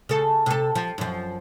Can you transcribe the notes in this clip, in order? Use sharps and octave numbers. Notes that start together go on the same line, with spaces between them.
C#3 A4
C3 A4
F3
F#2 F3